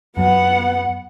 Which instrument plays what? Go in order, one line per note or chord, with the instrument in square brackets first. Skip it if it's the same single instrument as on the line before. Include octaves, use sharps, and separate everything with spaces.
[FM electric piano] F#2 F#3 [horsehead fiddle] B3 F#5